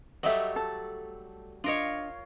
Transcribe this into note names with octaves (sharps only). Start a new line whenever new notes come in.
F#3 G3 A3 D#5 E5
A4
D4 F4 A#4 C#5 D#5